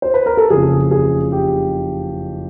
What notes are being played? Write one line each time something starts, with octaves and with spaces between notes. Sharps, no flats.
C5
B4
A#4
A4
F#1 F2 C#3 G#4
G#4
G4